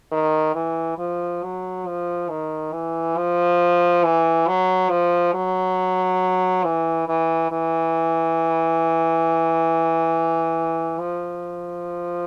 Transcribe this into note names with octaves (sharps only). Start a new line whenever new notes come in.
D#3
E3
F3
F#3
F3
D#3
E3
F3
E3
F#3
F3
F#3
E3
E3
E3
F3